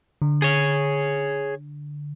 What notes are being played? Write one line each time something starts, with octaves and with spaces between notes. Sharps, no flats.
D3
G#4 C#5